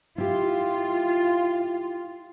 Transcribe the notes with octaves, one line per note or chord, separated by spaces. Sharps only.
E4 F4 G4